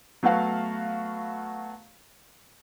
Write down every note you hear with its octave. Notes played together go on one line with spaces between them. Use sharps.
F#3 A3 B3 F#4 F5